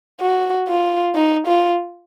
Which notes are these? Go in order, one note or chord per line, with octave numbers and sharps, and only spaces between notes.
F#4
F4
D#4
F4